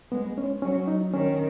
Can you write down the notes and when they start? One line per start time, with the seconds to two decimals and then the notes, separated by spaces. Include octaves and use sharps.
0.12 G#3 B3
0.38 C#4
0.62 F#3 C#4
0.87 D#4
1.13 D#3 C#4